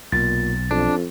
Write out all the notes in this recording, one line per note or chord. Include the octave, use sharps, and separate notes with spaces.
B1 A#2 A6
F2 D4